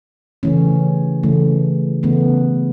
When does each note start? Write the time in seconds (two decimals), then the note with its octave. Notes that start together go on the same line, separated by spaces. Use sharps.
0.43 C#3 E3 A3 C#4
1.23 C#3 E3 A3
2.03 C#3 E3 A3 B3